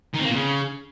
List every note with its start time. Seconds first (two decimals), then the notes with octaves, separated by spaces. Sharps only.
0.14 D#3
0.19 C4
0.24 A#3
0.30 A#2
0.35 C#3